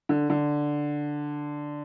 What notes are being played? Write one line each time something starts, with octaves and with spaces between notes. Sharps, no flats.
D3
D3